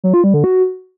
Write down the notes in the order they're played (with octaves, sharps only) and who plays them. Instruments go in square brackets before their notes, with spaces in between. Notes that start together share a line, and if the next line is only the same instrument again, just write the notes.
[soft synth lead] F#3
F4
G3
D3
F#4